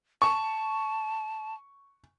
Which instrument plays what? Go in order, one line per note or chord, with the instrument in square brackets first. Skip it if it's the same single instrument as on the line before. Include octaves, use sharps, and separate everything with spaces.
[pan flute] A5 [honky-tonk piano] C#6